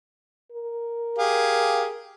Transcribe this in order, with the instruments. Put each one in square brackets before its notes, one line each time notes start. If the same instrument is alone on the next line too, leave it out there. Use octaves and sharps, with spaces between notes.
[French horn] A#4
[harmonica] G4 G#4 F5